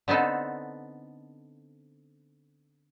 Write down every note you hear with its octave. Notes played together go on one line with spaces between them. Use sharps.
D3 B3 C4 D#4 A4